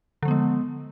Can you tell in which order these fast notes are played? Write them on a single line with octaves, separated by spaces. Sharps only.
D3 F3 B3 G#3